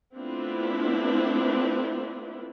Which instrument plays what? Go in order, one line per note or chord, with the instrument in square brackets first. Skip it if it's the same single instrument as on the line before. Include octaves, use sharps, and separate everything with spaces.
[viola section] A3 B3 C4 D4 E4 F4